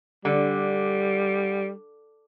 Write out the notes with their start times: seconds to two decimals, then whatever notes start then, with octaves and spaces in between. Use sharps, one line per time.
0.25 D3 G3